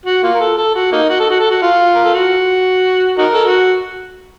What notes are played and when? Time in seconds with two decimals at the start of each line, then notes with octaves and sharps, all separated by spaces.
0.06 F#4
0.23 A#3 F4
0.34 A#4
0.40 A4
0.57 A4
0.75 F#4
0.92 A#3 D#4
1.10 F#4
1.20 A4
1.30 F#4
1.40 A4
1.50 F#4
1.62 F4
1.95 A#4
2.05 A4
2.14 F#4
3.18 D#4 F#4 A#4
3.34 A4
3.44 F#4